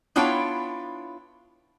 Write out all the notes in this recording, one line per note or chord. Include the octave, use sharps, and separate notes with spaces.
B3 D4 E4 F4 C#5 G5